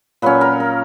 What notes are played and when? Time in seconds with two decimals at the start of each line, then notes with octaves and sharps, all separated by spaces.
0.22 A#2 F#3 C#4 B4
0.41 A#4
0.60 A#4